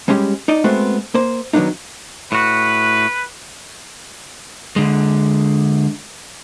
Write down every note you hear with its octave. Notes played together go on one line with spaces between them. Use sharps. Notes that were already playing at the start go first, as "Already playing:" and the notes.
G3 G#3 C#4 F#4 G4
D#4 D5 D#5
G#3 A3 B3 C4 F#4
A#3 C5
D#3 F#3 A#3 B3 D4 D#4
A2 F#4 B4
D3 G#3